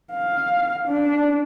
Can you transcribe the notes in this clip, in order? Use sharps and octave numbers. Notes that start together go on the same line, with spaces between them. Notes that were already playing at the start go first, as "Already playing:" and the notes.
F5
D4